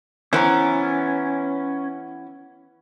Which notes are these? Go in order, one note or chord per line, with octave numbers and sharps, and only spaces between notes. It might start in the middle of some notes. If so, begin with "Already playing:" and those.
E3 B3 C#4 C5 A#5